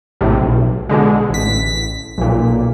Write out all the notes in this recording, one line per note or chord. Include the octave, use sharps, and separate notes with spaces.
A#1 A2 C3
B1
B2 D3 G#3
A1 B6
B1 A#2